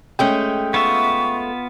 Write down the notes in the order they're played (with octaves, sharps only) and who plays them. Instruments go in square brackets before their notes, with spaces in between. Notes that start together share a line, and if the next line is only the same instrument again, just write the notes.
[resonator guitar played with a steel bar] G#3 A3 C#4 [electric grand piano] G5
[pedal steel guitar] B3 F4 E5 [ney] C#6